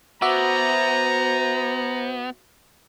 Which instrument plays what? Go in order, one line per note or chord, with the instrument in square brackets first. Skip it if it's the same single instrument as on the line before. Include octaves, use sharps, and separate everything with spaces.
[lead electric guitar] B3 [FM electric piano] F#4 E5 D6 [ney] C5 [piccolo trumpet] A#5